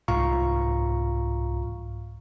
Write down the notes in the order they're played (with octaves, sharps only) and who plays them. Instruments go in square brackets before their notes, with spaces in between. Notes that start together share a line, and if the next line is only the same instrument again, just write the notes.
[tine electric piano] C2 G#2 F4 F5 A#5 C#6